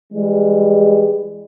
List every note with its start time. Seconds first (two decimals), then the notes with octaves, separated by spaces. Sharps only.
0.13 E3 G3 G#3